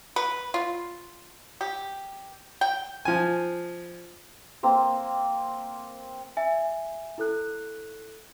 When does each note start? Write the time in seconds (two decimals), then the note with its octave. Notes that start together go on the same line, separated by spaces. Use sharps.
0.16 B4
0.54 F4
1.61 G4
2.61 G5
3.05 F3 G#5
4.63 A#3 C4 C5
6.37 E5 G#5
7.18 E4 A4 F#6